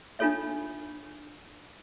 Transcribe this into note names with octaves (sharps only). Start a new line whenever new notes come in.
D4 D#4 F4 A4 C#5 E5